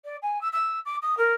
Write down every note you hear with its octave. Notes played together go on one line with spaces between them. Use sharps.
D5
G#5
E6
E6
D6
D#6
A#4